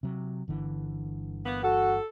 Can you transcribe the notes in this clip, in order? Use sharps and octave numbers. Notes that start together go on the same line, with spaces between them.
C3 F#3
G1 D3 E3
A#3 B3
F#4 A4